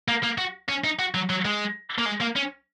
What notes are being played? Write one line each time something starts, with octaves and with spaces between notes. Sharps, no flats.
A#3
A#3
F#4
C#4
D#4
F#4
F#3
F#3
G#3
A#3
G#3
A#3
C#4